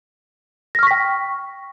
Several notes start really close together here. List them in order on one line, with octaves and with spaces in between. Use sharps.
A#6 F6 C#6 B6 G5